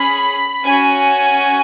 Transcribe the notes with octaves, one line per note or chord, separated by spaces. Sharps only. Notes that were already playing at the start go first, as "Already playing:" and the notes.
Already playing: C#4 G#4 B5
C#4 F#4 G#5